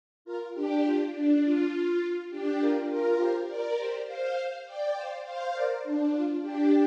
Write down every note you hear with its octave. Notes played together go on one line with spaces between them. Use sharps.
F4 A#4
D4 G4
F4
D4
F4
D4 G4
F4 A#4
F4 A#4
G4 C5
A#4 D5
G4 C5
C5 F5
D5 G5
C5 F5
C5 F5
A#4 D5
D4
F4
D4 G4